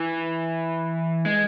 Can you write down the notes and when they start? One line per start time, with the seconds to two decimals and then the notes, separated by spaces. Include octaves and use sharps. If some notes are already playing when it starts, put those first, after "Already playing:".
Already playing: E3
1.25 G#3